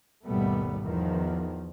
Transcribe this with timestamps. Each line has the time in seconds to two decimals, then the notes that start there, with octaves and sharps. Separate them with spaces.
0.25 G#1 D#2 B2 G3 A3 B3
0.82 E2 D#3 F3